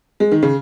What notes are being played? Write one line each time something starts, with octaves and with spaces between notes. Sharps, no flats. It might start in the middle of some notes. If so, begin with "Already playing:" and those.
G#3
D#3
C#3